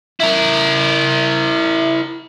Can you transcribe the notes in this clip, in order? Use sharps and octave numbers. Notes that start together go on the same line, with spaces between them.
E4 A#4